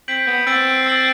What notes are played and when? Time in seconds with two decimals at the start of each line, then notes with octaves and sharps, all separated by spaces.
0.08 C4 G6 B6 D7 F#7
0.27 B3
0.47 C4 E6 A6 D7 F#7
0.86 E6 A6 D7 F#7